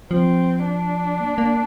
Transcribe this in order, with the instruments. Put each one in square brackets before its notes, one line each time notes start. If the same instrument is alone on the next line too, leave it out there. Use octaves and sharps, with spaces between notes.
[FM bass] F3 [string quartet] C4
[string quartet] D4
[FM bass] A#3
A#3